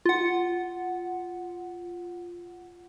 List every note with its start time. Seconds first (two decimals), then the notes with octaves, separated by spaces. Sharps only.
0.06 F4 F#5